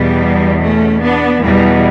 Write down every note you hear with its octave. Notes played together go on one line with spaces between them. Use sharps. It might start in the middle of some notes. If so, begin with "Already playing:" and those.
Already playing: E2 B2 G3 B3
A3 C#4
B3 D4
E2 B2 E3 G3